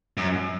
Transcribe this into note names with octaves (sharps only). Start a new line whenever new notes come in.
F#2